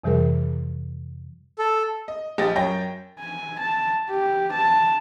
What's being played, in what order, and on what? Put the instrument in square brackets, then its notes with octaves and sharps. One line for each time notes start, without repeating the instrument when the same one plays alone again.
[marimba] F2 C3 E3 G3 G#4 A#4
[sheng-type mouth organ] A4
[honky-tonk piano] D#5
A#1 G4 D#5 A6 A#6
F#2 C#5 G5 A#6
[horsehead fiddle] G#5
A5
G4
A5